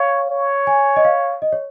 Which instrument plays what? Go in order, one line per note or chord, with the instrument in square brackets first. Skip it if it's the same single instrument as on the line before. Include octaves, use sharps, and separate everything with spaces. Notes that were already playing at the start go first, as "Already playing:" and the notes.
Already playing: [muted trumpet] C#5 [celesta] F5
[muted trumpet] C#5
[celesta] G#5
D#5
F5
D#5
C#5